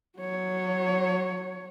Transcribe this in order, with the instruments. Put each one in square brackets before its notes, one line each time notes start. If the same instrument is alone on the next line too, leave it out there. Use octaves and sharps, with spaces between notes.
[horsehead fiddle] F#3 C#5